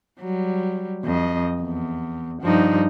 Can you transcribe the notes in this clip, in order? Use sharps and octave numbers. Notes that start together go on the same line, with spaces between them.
F#3 G3
F2 D#5
E2
G2 F3 D#4